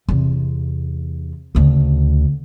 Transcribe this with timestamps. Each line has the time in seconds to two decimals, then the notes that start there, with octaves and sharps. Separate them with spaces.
0.09 E2 C3
1.55 D2 C#3